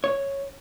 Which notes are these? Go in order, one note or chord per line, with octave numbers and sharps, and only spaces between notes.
C#5